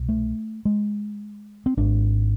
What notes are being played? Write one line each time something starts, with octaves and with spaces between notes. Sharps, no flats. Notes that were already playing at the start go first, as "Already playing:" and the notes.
Already playing: C2 B2
A3
G#3
C4
G#1 G#2 D4